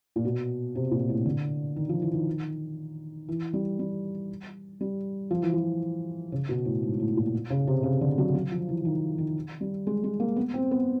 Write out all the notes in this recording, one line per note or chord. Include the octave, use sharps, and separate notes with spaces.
A#2
B2
C3
A#2
A2
D3
D#3
F3
E3
D#3
E3
G3
G3
G3
F3
E3
F3
C#3
B2
A2
G#2
A2
A#2
C#3
C3
C#3
D3
F#3
F#3
F3
E3
D#3
D#3
G3
G#3
G#3
A#3
B3
C4
B3